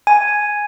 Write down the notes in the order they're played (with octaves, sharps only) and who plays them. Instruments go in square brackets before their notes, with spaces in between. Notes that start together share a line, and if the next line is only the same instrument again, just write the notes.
[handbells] G#5